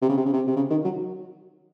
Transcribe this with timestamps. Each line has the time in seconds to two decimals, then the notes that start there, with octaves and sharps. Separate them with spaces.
0.02 C3
0.09 C#3
0.17 C3
0.26 C#3
0.33 C3
0.47 C3
0.56 C#3
0.70 D#3
0.85 F#3